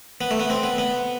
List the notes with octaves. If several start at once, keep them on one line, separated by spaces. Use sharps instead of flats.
B3
A3
B3
C4
B3
B3